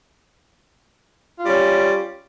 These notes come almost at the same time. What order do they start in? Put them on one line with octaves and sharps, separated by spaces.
F4 G3 C#4